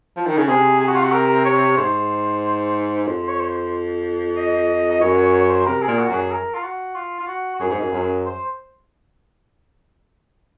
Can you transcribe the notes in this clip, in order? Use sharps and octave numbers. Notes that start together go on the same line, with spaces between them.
F3
D#3
C#3
C3 G#4
G#4
F#4
F4
F#4
A#4
C#5
G#2 C5
F2 C5
C#5
C5
D#5
D#5
F#2 C#5
C#5
C#5
C5
C3 A#4
G#4
A#2
F#4
F#2 G#4
A#4
F4
F#4
F4
F4
F#4
F#4
F#2 G#4
G#2
F#2
F#2
C5